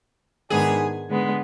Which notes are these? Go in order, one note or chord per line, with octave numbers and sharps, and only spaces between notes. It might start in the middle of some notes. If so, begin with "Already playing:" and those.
G#2 D#3 G#3 B3 D4 G#4
D3 G#3 B3